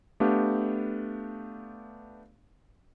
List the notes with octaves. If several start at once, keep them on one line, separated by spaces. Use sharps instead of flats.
A3 B3 D4 G4 F5